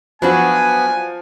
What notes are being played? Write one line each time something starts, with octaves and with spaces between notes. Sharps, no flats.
F3 F#3 B3 D4 F#4 B4 G#5